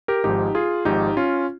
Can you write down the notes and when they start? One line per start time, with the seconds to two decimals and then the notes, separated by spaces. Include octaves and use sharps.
0.08 G4 A#4
0.24 G#1 G#2 F3 D#4 G4
0.55 F4 G#4
0.85 G#1 G#2 F3 D#4 G4
1.17 C#4 F4